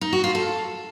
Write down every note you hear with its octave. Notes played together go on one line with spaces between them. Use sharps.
D#4
F#4
F4
A4